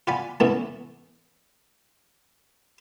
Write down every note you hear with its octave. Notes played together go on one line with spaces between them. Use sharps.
F4 D5 F#5 G#5 B5
E3 A3 B3 C#4 D4 E4